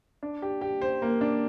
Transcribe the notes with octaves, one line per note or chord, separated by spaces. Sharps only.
D4
G4
G4
C5
A#3
D4